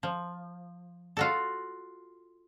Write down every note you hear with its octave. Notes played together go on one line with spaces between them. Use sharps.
F3
F4 F#4 A4